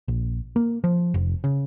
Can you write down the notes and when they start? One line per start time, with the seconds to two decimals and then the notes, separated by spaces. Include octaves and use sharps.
0.08 A#1
0.56 A#3
0.84 F3
1.14 F1
1.44 C#3